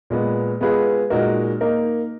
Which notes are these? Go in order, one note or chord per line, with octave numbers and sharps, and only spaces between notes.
A#2 G#3 B3
G#3 B3 F4 G#4 B4
A#2 G#3 D#4 F#4 A#4
A#3 D#4 A#4